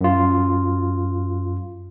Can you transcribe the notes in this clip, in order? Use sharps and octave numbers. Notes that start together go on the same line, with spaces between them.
F#2 F4